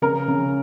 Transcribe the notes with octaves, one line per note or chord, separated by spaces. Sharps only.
C#3 A#4
C#3